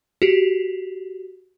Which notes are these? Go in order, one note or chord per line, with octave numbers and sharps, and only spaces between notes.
F#4 G4